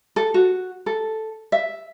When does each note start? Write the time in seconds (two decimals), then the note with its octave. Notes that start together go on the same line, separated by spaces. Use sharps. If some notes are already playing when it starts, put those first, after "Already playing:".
0.16 A4
0.34 F#4
0.86 A4
1.52 E5